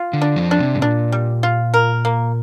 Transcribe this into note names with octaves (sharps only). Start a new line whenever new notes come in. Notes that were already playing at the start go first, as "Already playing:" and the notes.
Already playing: F4
D3
D4
F2 F3
D4
C3
G2
A#2 D4
G3
F4
A#4
A#3